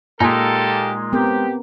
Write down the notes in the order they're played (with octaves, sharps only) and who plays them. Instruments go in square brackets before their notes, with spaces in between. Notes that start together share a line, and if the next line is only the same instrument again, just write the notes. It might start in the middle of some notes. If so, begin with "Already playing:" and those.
[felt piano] A#2 G#5 [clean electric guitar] G#3 D#4 [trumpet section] A#3 G4 A4
[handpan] B3 C4 A#4 [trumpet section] G4